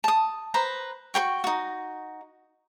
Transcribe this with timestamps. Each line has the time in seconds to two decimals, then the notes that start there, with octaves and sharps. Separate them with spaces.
0.04 A5 D#6
0.54 B4 C5 A#5
1.14 F#4 C5 G5 C#6
1.44 D#4 F#4